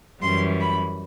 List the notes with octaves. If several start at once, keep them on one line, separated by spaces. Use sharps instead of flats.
F#2 E3 G3 C6
B5